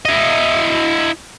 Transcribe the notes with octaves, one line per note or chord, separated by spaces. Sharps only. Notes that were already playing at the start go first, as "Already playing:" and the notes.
E4 D#5